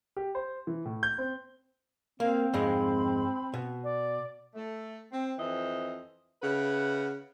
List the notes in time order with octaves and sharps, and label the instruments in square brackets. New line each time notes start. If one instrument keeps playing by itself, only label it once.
[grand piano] G4
C5
E3
A2
G6
C4
[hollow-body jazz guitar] A#3 [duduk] C4 [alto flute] F5
[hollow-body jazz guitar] F2 G#2 G#3 [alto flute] B5
[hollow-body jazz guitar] B2
[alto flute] D5
[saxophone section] A3
C4
F2 E3 C5 D#5
C#3 B4 E5 F#5